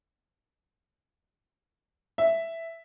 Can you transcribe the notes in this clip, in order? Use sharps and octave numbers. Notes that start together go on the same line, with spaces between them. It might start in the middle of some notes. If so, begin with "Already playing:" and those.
E5